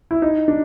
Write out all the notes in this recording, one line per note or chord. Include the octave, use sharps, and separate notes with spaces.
E4
D#4
D4